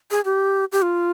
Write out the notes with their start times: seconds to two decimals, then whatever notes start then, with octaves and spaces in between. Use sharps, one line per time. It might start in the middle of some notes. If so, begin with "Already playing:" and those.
0.11 G#4
0.25 G4
0.72 G4
0.82 F4